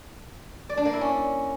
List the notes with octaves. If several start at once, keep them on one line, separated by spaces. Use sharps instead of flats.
D5
D4
A#3
E4
C#4